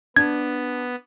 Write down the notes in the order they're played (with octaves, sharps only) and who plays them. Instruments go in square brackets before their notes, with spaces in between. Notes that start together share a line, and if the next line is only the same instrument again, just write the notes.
[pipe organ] B3 [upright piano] D4 [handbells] G#6